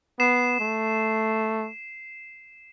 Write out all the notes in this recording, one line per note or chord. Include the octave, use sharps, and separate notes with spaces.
B3 C7 E7
A3